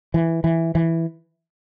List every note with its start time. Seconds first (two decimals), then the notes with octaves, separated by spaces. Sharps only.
0.14 E3
0.44 E3
0.75 E3